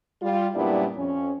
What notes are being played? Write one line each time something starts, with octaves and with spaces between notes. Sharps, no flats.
G3 F4
F#2 A#2 G3 B3 D4 E4
F2 C#4